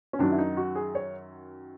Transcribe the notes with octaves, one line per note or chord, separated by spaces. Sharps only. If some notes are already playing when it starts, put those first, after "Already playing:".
C#4
F#2 D#3 F#3 D4
E4
D#4
F#4
G#4
C#5